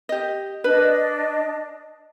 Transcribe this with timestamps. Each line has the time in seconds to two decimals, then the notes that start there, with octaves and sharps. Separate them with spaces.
0.09 G4 D#5
0.64 D4 B4 D#5